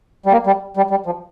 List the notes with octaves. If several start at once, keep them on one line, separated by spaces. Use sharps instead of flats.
G3
A#3
G3
G3
G3
F3